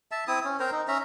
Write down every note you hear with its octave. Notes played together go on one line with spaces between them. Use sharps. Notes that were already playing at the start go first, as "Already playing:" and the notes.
E5 A5
C4 E4 D#6
C#4
C4 A#4 C5 A#5
D#4
C#4 E5 A#5